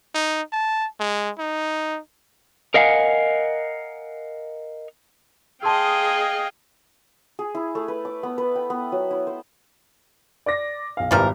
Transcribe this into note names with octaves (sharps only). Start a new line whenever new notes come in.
D#4
A5
G#3
D#4
A#4 D#5 F5 F#5 G#5
G#4 D#5 F5 G5 A5 C6 E6
G#4
E4
A3
B4
D6
B3
B4
G5
B3
F#3
E4
C5
D5 D6 A#6
B1 F5
G#1 E3 F3 G3 A#4